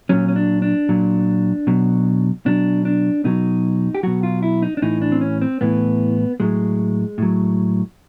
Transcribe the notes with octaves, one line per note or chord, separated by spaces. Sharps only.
A#2 F#3 C#4
C#4
D4
D4
A#2 F#3
B2 F#3
B2 F#3 D4
D4
B2 F#3 D#4
G4
B2 F#3 F#4
F4
E4
D#4
D4
A2 E3 D#4
D4
C4
C#4
C4
A2 E3 B3
A2 F#3 G#3
A2 F#3